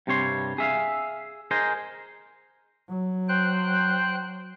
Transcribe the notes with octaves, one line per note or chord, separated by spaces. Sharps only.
G2 C3 G3 C#5 C6
G#4 E5 F5
G#4 A#4 C5 D#5
F#3
C5 G5 F#6